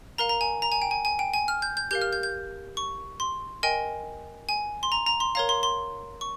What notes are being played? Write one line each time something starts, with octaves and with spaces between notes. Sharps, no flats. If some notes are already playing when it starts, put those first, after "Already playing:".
A#4 F5 A#5
A#5
G#5
A#5
G#5
G5
G#5
G#5
G5
G#5
F6
G6
G6
G4 A#4 F5 G6
F6
G6
G6
C#6
C6
A#4 D#5 G5 G#5
G#5
C6
A#5
A#5
C6
A#4 C#5 F5 A#5
C6
C6
C#6